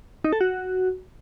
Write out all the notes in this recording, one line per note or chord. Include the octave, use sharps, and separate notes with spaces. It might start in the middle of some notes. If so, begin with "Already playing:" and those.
D#4
A4
F#4